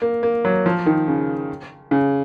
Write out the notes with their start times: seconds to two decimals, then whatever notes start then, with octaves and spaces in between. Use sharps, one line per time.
0.02 A#3
0.23 A#3
0.45 F#3
0.66 F3
0.86 D#3
1.08 C#3
1.91 C#3